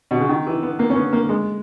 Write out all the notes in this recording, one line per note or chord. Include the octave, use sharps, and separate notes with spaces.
B2
C#3
D#3
E3
B3
A#3
C#4
B3
A#3
G#3